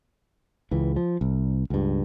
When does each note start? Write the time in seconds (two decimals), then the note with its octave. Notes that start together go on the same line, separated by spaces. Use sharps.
0.71 C#2 E3
0.96 F3
1.21 C2
1.70 C#2 G2